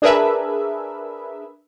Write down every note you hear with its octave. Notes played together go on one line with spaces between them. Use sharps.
D4 G#4 A#4 B4 E5